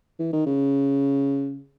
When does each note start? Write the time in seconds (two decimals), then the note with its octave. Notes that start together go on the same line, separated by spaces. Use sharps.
0.19 E3
0.33 D#3
0.46 C#3